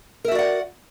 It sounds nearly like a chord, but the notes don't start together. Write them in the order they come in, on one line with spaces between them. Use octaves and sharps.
A#4 E5 F#4 D5 F#5